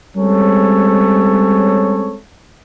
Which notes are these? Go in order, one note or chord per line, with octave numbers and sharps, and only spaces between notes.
G3 G#3 C4 C#4 A4 C#5